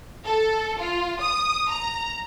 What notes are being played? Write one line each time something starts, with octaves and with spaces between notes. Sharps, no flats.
A4
F4
D#6
A#5